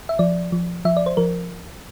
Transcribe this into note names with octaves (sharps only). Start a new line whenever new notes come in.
E5
F3 D5
F3
F3 E5
D5
C5
F3 A#4